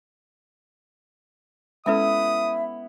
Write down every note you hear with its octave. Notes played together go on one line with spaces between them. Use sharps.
G#3 B3 C#4 E4 A4 E5 D#6